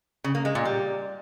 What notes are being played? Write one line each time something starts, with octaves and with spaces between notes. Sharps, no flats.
C#3
A#3
G#3
A#2
G3